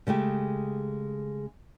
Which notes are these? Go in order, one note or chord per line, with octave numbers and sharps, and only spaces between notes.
C#3 G#3 A3 G4